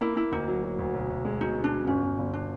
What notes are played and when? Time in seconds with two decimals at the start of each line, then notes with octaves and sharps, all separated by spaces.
0.01 A#3 E4
0.16 A#3 E4
0.32 D2 D#4
0.47 F#3
0.63 F#3
0.78 D2
0.94 B1
1.10 B1
1.25 G#3
1.41 B2 D#4
1.56 B2
1.64 D4
1.72 B2
1.87 G1 C#4
2.02 G1
2.18 G1
2.33 D4